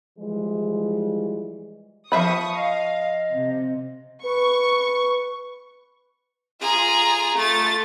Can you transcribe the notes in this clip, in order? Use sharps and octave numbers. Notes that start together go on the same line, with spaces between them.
E3 F3 G3 G#3
F3 E5 B5 C#6 D#6
D#5 F5
C3
B4 C#6
F4 G#4 A#5
A3 F4 A6